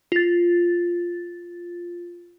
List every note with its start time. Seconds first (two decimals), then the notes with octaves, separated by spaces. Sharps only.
0.12 F4 A6